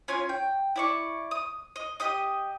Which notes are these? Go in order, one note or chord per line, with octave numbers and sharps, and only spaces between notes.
C#4 F4 C#5 G#5
G5
E4 D5 C#6
D#6
D#5
G4 D#5 D#6